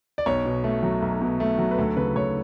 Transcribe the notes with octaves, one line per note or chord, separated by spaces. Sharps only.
D5
B1 C#5
B2
A3
F#3
B1
B2
A3
F#3
B4
D2 A4
C#3 B4
D2 C#5